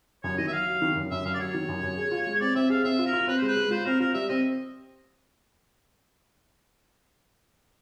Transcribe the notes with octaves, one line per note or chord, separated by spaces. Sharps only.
F#2 C#5
D#3 D#5
E5
F#3 F5
F#3
D#3
F#2
F#2 E5
F#2 F5
D5
F#3 C#5
D#3
F#2
F#2
G#4
F4
G#3
C#5
C4 D5
C4 E5
G#4 F5
C4 E5
F4
A#4
F4
C4 B4
G#3 C5
B4
G#3
F4 C5
C4 A#4
F4 A#4
G3 E5
C4 D#5